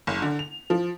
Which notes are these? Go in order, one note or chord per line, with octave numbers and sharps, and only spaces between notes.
F#1
D3
F7
F3